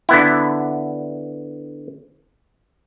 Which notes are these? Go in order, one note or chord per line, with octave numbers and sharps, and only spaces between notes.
D3 B3 E4